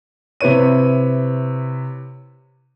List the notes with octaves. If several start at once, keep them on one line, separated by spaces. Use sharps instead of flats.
C3 E4 B4 C#5 D#7